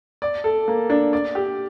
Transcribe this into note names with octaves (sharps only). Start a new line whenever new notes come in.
D5
A4
A#3
D4
D5
G4